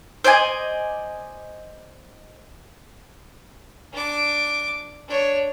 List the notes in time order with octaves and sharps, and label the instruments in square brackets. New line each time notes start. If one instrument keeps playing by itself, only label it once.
[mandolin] C5 D5 D#5 G#5
[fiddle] D4 D6
D4 C#5